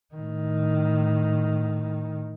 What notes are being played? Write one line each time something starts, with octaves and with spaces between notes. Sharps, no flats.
A2 D#3